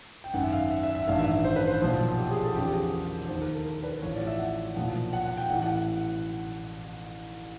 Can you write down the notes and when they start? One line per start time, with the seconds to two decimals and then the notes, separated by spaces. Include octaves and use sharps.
0.24 G5
0.34 G#1 F#2 D#3 F#5
0.44 E5
0.52 F5
0.71 E5
0.83 E5
0.95 E5
1.07 A1 G2 D#3 F5
1.19 E5
1.44 C5
1.56 B4
1.68 C5
1.81 B1 A#2 F3 C5
2.18 G4
2.31 G#4
2.43 A4
2.55 E2 C#3 F3 G4
2.73 G#4
2.92 A#4
3.28 D#2 D#3 C5
3.41 A#4
3.53 A4
3.66 A#4
3.84 B4
4.02 A1 A2 F3 C#5
4.15 D5
4.27 E5
4.39 F#5
4.76 B1 A#2 F3 F#5
5.13 F#5
5.25 F#5
5.37 G5
5.50 A1 A2 E3 F#5
5.62 F#5